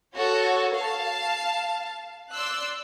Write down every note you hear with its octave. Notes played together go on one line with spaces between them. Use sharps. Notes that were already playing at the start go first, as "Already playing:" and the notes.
F#4 A4 C#5
F5 A5
D5 C6 E6 F#6